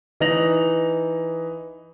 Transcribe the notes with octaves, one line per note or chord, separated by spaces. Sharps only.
E3 D#4 A#6 F7 F#7